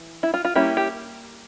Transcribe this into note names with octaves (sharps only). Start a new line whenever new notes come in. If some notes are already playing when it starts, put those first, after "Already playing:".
Already playing: E3
E4
F4
F4
G3 A#3 C#4 E4 G4
G4